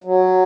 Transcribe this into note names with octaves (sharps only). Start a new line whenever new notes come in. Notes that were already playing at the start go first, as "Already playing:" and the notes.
F#3